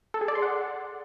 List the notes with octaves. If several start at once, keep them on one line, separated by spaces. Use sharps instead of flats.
A4
G#4
D5
C6
F#5